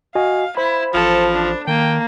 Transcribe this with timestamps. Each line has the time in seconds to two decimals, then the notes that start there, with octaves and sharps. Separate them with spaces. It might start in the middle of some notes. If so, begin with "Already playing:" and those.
0.15 F#4 D#5 F5 G#5
0.57 E4 C5 B5
0.94 A1 F3 A4
1.34 D4
1.67 D#3 A#3 G5